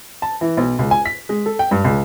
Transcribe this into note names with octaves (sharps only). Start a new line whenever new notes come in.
A5
E3
B1
C#2
G#5
B6
G#3
A4
G5
G2
C#2